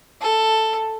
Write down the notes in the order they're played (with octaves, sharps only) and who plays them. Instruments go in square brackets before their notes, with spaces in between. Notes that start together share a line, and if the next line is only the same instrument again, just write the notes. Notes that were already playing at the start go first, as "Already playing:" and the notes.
[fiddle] A4